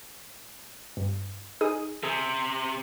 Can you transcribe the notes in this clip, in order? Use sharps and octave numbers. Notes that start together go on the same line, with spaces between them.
G2
D#4 G#4 D#6
C3 G#4